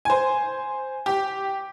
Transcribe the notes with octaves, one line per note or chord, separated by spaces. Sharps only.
C5 G#5
G4